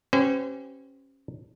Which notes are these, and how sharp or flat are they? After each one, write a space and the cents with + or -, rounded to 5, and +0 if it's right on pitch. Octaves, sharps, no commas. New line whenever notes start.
C#4 -25 G4 -25 C5 -45